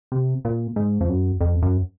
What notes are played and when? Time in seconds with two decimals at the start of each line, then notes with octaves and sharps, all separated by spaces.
0.12 C3
0.45 A#2
0.76 G#2
1.01 F2
1.09 F#2
1.41 F2
1.62 F#2